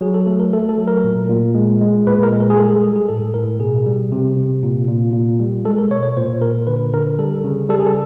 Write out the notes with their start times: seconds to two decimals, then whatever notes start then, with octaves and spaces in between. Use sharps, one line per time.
0.01 F#3 G#4
0.14 A4
0.27 A3 A4
0.40 A#4
0.53 A3 A4
0.69 A4
0.78 F#3
0.87 A#4
1.04 A#2
1.29 A#2
1.55 G#3
1.81 G#3
2.07 A#2 B4
2.23 A#4
2.32 G#3
2.40 A#4
2.50 G#4
2.58 G3 A4
2.71 G#4
2.84 G3 A4
2.96 G#4
3.09 A2 A4
3.34 A2 A#4
3.59 B2 G#4
3.86 G3
4.12 C3
4.36 C3
4.63 A#2
4.88 A#2
5.13 A#2
5.40 G3
5.65 G#3 A4
5.78 A#4
5.90 B2 C#5
6.03 C#5
6.16 A#2 C5
6.41 A#2 A#4
6.67 D3 B4
6.93 D3 A#4
7.19 G3 A4
7.44 C#3
7.69 G3 A4
7.79 G#4
7.87 A4